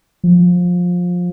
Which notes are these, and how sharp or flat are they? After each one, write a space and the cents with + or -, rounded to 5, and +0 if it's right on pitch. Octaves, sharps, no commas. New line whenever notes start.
F3 +20